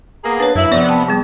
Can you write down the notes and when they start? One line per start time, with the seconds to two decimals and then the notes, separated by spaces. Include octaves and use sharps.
0.24 A#3 B3 G#4 A#5
0.40 D4 B4 C#5
0.55 F#2 E4 E5
0.72 C3 F3 B3 D5
0.89 G5 A5
1.08 G3 B3 G#4